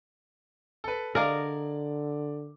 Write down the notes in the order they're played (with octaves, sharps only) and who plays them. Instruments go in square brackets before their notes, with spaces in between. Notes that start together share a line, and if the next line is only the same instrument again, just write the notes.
[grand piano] A4 B4
[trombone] D3 [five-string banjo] G#4 D#5 F5 [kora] A#4 [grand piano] D5 D6